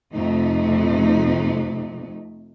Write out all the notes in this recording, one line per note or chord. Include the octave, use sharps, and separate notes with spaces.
F2 C3 A3 D#4